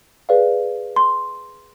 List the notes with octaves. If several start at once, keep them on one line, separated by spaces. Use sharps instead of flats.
G#4 B4 D5 F5
C6